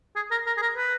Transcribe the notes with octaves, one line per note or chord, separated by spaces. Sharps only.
G#4
A#4
A#4
G#4
A#4
B4